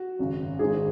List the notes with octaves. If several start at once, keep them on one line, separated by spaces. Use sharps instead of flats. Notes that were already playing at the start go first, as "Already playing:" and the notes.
Already playing: F#4
G#1 F#2 C#3
G#1 G#2 G#3 G#4